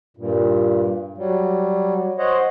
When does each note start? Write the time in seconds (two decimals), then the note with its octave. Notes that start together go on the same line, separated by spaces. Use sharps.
0.17 G2 A#2
1.17 F#3 G3
2.18 C5 C#5 D#5 F#5